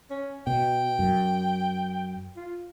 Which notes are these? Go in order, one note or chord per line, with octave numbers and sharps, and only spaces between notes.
C#4
B2 G5
F#2
F4